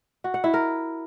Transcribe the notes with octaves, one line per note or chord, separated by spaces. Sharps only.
F#4
F#5
E4
A#4